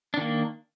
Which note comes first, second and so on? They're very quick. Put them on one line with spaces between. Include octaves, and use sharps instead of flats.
D4 D#3 A#3